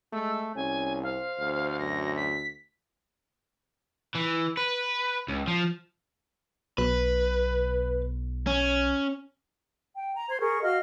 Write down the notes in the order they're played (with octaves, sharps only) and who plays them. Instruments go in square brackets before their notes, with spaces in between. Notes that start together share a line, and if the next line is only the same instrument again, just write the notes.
[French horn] G#3 [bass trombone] A3 [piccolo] E6
[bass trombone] C2 [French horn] C#4 [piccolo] G#5
[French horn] C5 [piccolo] F5
[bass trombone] D2
[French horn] F#2 [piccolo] A#6
[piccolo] B6
[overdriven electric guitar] E3
B4
C#2
F3
[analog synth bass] B1 [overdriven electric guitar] B4
[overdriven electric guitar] C#4
[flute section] G5
A#5
C5 C6 G#6
G#4 A#4 C#6
F#4 D#5 F5 F6